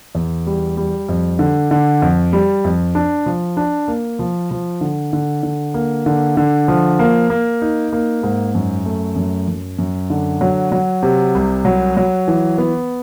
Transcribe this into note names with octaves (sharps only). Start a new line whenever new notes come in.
E2
G3
G3
F2
D3
D3
F2
G3
F2
D4
F3
D4
A#3
F3
F3
D3
D3
D3
A#3
D3
D3
F3
A#3
A#3
D#4
A#3
G#2
F#2
A3
F#2
F#2
F#2
D3
F#3
F#3
C3
C2
F#3
F#3
E3
B3